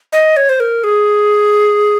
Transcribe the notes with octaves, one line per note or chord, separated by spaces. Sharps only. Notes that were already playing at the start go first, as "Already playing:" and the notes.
D#5
C#5
C5
A#4
G#4